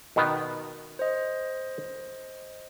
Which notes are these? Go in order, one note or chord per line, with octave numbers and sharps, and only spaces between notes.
B2 D#3 B3
C5 D#5